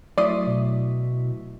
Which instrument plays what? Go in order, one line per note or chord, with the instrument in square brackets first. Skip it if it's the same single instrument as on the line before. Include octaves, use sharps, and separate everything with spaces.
[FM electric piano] F#3 A3 E4 [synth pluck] D5 C6 D#6
[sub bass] B2